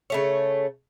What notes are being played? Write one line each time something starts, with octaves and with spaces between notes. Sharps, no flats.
C#3 A3 C#5